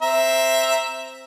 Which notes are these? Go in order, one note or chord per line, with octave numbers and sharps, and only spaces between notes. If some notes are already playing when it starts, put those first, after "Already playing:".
C4 E5 A#5